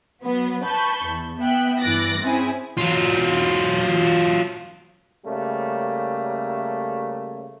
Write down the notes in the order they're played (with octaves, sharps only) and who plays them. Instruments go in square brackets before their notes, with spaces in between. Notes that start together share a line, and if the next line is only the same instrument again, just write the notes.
[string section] F#3 B3
B4 A5 B5 C#6 G6
E2
B3 E5 G5 F#6
G2 E3 D6 F#6 A6 A#6
C4 C#4 E4 G#4 G#5
[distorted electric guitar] F#3 F4
[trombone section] C#3 G3 A3 A#3